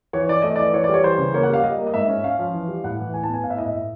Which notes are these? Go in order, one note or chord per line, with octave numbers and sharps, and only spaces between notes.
E3 C#5
E3 D5
A3 D#5
E3 D5
E3 C#5
D5
G3 C#5
E3 C5
C#3
A#3 C#5
F#5
G3 F5
G3 D#5
A#3
D#5
G#2 E5
C#4
C#4 F5
F3
E3
G3
A2 F#5
E3
A2 G#5
A5
B3
G#5
A2 F5
E5
A2 D#5
E5
A2